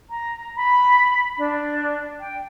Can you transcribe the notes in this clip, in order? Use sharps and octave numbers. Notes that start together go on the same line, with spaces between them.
A#5
B5
D4
G5